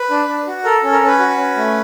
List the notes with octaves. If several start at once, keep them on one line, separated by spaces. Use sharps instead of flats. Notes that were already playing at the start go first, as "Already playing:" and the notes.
Already playing: B4
D4
D4
F#4
A4 A#4
C#4
A#4
C#4
B4
F#4
C#4
A3